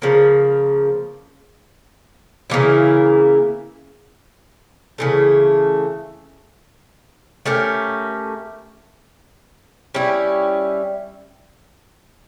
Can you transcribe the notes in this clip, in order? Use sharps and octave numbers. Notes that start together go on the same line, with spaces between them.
C#3 F3 A#3
C#3 E3 A#3 E4
C#3 E3 A3
A3 C#4 G4 A#4
G3 C#4 E4